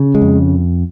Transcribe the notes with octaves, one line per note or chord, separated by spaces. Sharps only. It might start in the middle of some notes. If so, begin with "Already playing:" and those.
Already playing: C#3
G#3
F2